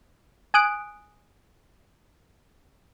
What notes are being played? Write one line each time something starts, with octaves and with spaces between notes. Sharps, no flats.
G#5 D#6 F#6 D7